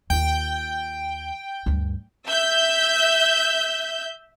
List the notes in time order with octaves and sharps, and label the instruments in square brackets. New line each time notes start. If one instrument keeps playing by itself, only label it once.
[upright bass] D#2 F4 [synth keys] G5
[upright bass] D2 G2
[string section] E5 G6